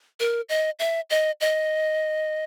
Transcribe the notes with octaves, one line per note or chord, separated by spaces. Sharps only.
A#4
D#5
E5
D#5
D#5